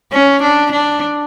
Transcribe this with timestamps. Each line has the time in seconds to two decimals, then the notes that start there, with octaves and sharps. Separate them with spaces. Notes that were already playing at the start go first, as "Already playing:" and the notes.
0.12 C#4
0.42 D4
0.72 D4